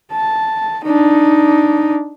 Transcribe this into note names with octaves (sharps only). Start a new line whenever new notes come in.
A5
D4 D#4